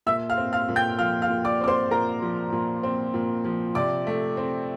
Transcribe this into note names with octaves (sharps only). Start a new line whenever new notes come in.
A#2 E5 E6
F5 F6
C4
F5 F6
A#2
G5 G6
F3 F5 F6
F5 F6
A#2
D5 D6
C4 D6
C5 C6
A#2 A#4 A#5
F3
A#2
C4
A#2
F3
C3 D5 D6
A3
C4